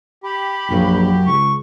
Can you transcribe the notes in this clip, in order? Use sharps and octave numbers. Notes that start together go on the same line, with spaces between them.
G4 B5
A#1 F#2 F#3 F5
C#2 C#6